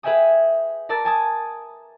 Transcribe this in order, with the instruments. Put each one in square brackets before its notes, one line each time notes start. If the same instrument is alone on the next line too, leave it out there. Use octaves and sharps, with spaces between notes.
[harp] G#4 B4 E5 G5 G#5 D#6
A#4 D5 A5 E6 A6 A#6
G#5 A5 D#6